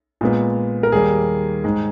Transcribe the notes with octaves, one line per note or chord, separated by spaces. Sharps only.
A#2 G#3 B3
A#4
D#2 D#3 G3 A#3 G#4
G#2 D#3 G#3